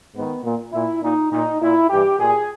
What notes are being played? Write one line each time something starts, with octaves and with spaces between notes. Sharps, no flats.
G#2 D#3 B3
A#2
A#2 E4
A#2 D#4
A#2 D#4
A#2 E4
G2 E3 G4
A#2 G#4